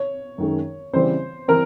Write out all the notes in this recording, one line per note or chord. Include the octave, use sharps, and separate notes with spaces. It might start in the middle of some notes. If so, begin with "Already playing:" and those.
Already playing: C#5
F#2 D#3 G#3
C#3 E3 G3 C4 C5
E3 G3 C4 A#4